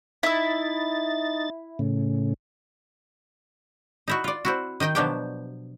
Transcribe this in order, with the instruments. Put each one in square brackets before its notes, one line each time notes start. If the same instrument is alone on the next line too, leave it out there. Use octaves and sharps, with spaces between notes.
[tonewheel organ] D#4 A6 [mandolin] E4 E6
[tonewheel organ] A2 C#3
[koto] D#4 E4 F#4
F4 D5
C4 E4 F#4
D#3 D#4 D#5 G5
B2 F3 F#3 D4 G4 G5